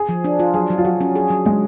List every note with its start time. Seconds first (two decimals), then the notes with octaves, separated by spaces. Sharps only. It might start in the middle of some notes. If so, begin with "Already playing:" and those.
Already playing: G#4
0.09 F3
0.24 D4
0.40 F4
0.54 F#3 G#4
0.70 F#3
0.78 F4
0.85 F#3 F#4
1.01 C#4
1.15 G#4
1.30 F#3
1.46 F#3 G#3